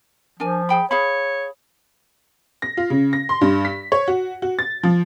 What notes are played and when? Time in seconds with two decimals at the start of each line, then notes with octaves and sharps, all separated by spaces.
0.40 F3 D4 A#4 G#5
0.69 G#4 G5 B5
0.91 G#4 C#5 F5 B5
2.62 A#6
2.77 F4
2.90 C#3
3.13 A#6
3.29 C6
3.41 G2
3.65 B6
3.92 C#5
4.08 F#4
4.42 F#4
4.59 A6
4.83 F3